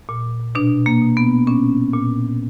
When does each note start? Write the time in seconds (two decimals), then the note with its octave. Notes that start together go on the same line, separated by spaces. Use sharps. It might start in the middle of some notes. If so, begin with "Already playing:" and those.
0.09 A#2
0.55 B2 D4
0.86 A#3
1.02 B2
1.17 B3
1.47 A#2 C#4
1.94 A#2